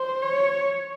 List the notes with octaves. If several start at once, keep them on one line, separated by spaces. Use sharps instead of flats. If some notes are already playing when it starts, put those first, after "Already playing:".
Already playing: C5
C#5